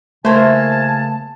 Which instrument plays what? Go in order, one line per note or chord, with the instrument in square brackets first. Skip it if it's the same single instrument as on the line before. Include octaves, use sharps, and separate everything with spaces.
[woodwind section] C#3 G#5 A5 [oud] E3 A#3 C5 [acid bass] A3